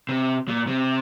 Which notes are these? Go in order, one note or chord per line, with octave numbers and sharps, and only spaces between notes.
C3
A#2
C3